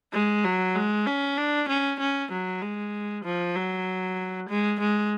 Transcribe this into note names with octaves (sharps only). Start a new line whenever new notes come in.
G#3
F#3
G#3
C#4
D4
C#4
C#4
F#3
G#3
F3
F#3
G#3
G#3